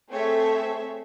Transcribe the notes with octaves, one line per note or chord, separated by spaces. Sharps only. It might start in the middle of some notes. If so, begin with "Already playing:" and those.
A3 C4 G#4 A4 C#5 E5